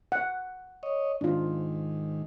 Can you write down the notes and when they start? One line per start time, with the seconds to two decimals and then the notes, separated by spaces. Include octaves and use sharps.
0.12 F#5
0.83 C#5 D#5
1.21 G#2 D#3 D4 F4